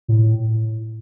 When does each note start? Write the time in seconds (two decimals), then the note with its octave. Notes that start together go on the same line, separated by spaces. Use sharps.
0.08 A2